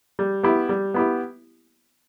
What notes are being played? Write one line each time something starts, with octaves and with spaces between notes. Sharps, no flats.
G3
B3 E4 G4
G3
B3 E4 G4